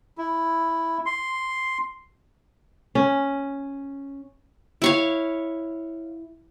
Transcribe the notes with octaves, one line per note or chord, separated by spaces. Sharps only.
E4
C6
C#4
E4 C#5 F5